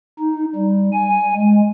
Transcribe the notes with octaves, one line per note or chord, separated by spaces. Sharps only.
D#4
G3
G#5
G#3